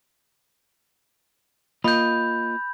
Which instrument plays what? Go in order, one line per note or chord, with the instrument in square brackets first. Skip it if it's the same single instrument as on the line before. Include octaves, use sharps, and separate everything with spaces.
[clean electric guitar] A#3 F4 D#5 [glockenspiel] B5 G6